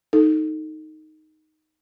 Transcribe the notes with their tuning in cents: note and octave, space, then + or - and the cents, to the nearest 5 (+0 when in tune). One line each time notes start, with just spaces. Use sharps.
D#4 +0 A4 +0